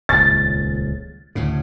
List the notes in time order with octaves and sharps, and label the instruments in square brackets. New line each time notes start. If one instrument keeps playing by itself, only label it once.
[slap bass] D#1 C#2 [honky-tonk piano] A6
[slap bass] D2 A2 C#3